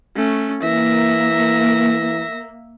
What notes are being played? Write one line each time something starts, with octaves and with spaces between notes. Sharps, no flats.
A3 C#4
E3 A#3 E5 A#6